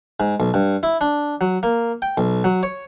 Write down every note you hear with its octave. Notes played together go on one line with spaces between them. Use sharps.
G#2
B1
G2
E4
D4
F#3
A#3
G5
B1
F#3
C#5